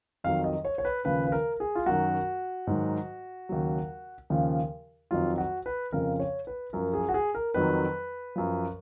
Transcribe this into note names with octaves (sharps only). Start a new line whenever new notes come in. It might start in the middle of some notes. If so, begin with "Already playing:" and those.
F2 D#3 F#3 F5
D#5
C#5
C#5
B4
D#2 C#3 F3 B4
B4
A#4
G#4
F4
F#2 D#3 F#3 F#4
G#2 D#3 F#3
D#2 C#3 F#3
D#2 C#3 F3
F2 D#3 F#3 F4
F#4
B4
F2 C#3 F3 A#4
C#5
B4
F#2 F3 A#4
G#4
F#4
G#4
A#4
F2 D#3 F#3 B4
F#2 F3